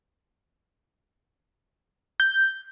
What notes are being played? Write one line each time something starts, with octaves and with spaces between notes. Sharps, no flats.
G6